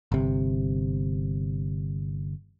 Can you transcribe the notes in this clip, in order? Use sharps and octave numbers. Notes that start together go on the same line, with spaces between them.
G1 C3